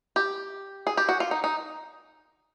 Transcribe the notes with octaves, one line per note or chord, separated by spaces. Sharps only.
G4
G#4
G4
F#4
F4
D#4
D#4